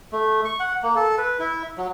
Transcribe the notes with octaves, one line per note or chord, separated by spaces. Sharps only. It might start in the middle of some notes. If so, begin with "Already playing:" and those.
A3
C#6
F#5
A#3
A4
B4
E4
F#3